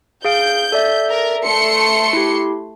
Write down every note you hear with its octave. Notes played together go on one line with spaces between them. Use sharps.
G#4 F5 G6 D7
A4 D5 E5
A#4
A3 C6 C#7
E4 G4